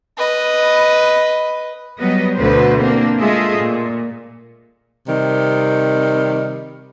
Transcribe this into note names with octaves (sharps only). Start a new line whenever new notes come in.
B4 D#5
F#3 G3 B3 B4 D#5
D2 B2 D3 B4 C5
A#3 C4 D4
G#3 A3 F4 G#4 D#5 E5
A#2
C3 D#3 G3